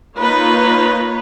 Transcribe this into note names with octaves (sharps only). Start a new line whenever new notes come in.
A#3 D#4 F4 B4 C#5